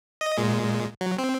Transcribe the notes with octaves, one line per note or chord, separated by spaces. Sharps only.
D#5
A#2 G#3
F#3
C4